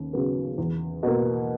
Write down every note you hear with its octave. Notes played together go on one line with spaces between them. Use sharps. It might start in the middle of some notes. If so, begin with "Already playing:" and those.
Already playing: D#2 C#3
C#3 F#3 B3
E2
B2 A#3